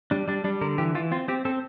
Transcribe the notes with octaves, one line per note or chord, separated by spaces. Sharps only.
G3 D4
G3 D4
G3 D4
D3 A#4
E3 G4
E3 F4
C4 F4
C4 G4
C4 A4